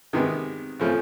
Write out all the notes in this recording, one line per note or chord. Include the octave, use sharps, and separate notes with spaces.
C3 D#3 G#3 B3
C#3 F3 A3